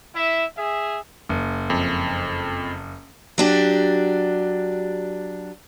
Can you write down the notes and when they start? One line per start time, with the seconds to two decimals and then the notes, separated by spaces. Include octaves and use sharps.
0.14 E4 E5
0.57 G#4 E5
1.29 F#1
1.70 F2
3.38 F#3 D4 G4